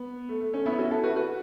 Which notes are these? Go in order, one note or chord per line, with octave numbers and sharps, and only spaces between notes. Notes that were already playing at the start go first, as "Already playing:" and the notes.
Already playing: B3
A3
A3
A3 C#4
B3 E4
C#4 F#4
E4 A4
F#4 B4
F#4 B4